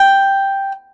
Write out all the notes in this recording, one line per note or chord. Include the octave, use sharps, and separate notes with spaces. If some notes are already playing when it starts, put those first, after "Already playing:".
Already playing: G5